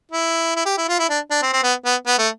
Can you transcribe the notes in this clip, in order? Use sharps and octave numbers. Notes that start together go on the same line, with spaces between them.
E4
E4
G4
E4
F4
E4
D4
D4
C4
C4
B3
B3
B3
A3